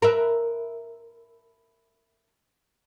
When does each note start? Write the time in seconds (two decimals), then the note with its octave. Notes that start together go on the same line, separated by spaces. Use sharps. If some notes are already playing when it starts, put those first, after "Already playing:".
0.02 A#4 B4 E5